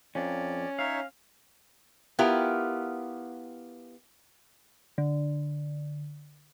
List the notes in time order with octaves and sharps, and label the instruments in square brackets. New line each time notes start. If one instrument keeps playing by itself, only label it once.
[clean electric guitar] F2 [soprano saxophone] C#4 [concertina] D5
[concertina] D#4 C#5 E5 [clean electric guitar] F5
[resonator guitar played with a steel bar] B3 E4 F4 G4 A#4
[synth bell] D3